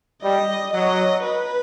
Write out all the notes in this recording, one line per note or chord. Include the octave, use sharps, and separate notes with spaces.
G3 D#5
F#3 D#5
B4